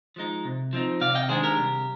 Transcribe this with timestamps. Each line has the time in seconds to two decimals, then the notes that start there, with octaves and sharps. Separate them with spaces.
0.16 F3 G#3 D#4
0.45 C3
0.73 F3 C4 D#4
1.01 C3 D5 F5
1.15 D#5 G5
1.28 D#3 G#3 D4 G#4 C5
1.43 G4 A#4
1.57 C2